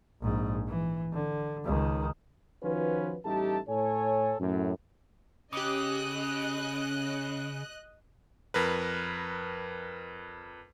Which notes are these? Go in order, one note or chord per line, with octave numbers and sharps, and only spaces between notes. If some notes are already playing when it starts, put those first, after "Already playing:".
A#1 G#2
E3
D3
C#2 D#3
D#3 F3 C#4 F4 F#4 B4
A1 G3 A3 D#4 G4 A5
A2 A4 C#5 G#5
F#2 A2
C#3 C#4 G4 D#5 D6 F#6
F2 A#4 B4